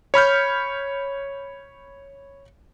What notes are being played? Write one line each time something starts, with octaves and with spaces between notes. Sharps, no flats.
C#5 B5 F6 G6